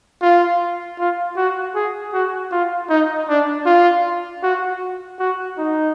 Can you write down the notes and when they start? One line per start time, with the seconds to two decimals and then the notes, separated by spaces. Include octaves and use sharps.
0.21 F4
0.99 F4
1.37 F#4
1.75 G#4
2.13 F#4
2.51 F4
2.89 D#4
3.28 D4
3.66 F4
4.43 F#4
5.19 F#4
5.57 D#4